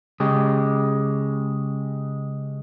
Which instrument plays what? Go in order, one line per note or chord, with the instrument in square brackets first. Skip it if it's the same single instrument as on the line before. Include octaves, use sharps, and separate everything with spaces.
[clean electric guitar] C#3 G#3 G4